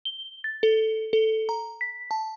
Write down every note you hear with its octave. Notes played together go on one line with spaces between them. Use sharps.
G7
A6
A4
A4
A#5
B6
A5